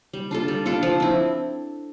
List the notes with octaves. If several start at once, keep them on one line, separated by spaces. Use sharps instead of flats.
G3
D4 F4 A4
G3
D4 F4 A4
F3
C4 E4